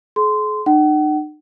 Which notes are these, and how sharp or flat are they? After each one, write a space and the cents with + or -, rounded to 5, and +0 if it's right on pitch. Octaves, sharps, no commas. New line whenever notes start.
G#4 +45 C6 -15
D#4 -45 F#5 +40